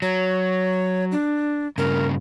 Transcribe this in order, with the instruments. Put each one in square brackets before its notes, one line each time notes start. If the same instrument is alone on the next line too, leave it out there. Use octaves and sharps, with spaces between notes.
[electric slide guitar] F#3 [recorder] C#5
[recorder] D4
[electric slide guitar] G2 C#3 [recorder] A#4